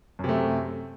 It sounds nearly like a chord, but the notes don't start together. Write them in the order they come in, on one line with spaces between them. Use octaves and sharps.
F#2 C3 A3